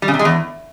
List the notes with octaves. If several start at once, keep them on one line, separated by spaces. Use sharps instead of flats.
G3
C#3
C3
G#3
E2